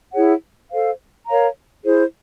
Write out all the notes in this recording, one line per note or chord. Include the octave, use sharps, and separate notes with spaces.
E4 G#4 C#5 F#5
A4 C5 F5
A#4 C#5 F5 A#5
E4 G#4 C5